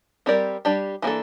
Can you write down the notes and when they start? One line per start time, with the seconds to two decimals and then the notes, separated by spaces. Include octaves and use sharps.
0.26 G3 C4 G4 A#4 D5
0.65 G3 D4 G4 D5
1.02 E3 A#3 D4 A4